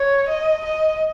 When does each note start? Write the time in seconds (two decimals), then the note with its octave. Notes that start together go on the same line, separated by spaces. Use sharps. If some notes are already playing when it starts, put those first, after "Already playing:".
Already playing: C#5
0.29 D#5
0.66 D#5